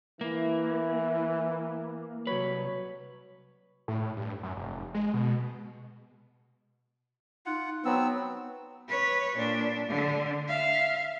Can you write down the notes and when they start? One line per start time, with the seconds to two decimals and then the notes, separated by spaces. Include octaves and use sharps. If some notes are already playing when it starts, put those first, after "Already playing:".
0.21 E3 A#3 E4
2.27 C2 F#3 B4 C#5
3.88 A2
4.17 G2
4.43 F#2
4.56 F1
4.94 G#3
5.14 B2
7.46 D#4 F4 F#5
7.85 F#3 B3 C4 E6
8.88 B4 C#5
9.36 A#2 D4
9.88 D3
10.48 E5 F5